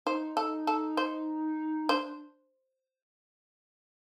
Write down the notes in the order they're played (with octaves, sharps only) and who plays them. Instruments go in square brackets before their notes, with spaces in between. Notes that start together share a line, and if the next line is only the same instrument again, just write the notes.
[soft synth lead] D#4 [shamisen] C5
[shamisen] A4
A4
C5
[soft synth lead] D4 [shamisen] C5